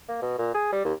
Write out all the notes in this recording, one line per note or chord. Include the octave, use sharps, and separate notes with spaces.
A#3
B2
A#2
G#4
G3
D#2